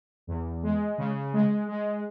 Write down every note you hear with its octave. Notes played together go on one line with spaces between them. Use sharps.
E2
G#3
C#3
G#3
G#3